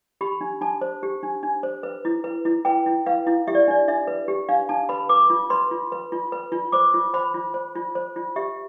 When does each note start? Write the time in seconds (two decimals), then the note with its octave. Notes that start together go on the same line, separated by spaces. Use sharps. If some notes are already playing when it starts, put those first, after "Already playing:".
0.21 G4 B5
0.41 D4
0.61 D4 A5
0.81 C5
1.03 G4
1.23 D4
1.43 D4
1.63 C5
1.83 B4
2.05 E4
2.24 B4
2.45 E4
2.65 B4 G5
2.86 E4
3.06 B4 F5
3.27 E4
3.47 G4 E5
3.55 D5
3.68 D4 D5
3.88 D4 E5
4.07 B4
4.28 G4
4.49 D4 F5
4.69 D4 A5
4.89 B4 B5
5.09 B4 D6
5.30 F4
5.50 B4 C6
5.71 F4
5.92 B4
6.12 F4
6.32 B4
6.52 F4
6.72 C5 D6
6.94 F4
7.14 C5 B5
7.34 F4
7.54 C5
7.75 F4
7.95 C5
8.16 F4
8.36 G4 E5